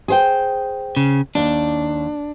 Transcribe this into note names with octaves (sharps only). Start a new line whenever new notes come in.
G#4 C5 G5
C#3
D#2 D4